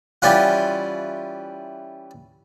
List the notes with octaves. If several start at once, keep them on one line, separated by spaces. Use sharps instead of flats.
E3 G3 C#4 F4 F#5